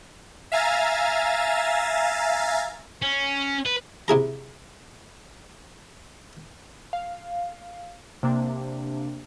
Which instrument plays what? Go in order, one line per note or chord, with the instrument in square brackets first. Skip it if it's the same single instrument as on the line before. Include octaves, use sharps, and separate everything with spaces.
[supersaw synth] E5 F5 G#5 A#5 A6
[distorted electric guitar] C#4
B4
[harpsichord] C3 E4 G#4 A#5
[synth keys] F5
C3 A#3 D4